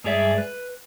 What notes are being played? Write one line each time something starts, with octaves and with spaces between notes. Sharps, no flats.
G2 G#3 G#4 D5 E5
B4